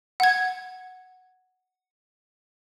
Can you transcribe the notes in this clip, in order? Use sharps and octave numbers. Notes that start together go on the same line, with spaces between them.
F#5 G#6